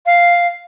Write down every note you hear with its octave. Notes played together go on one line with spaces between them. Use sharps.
F5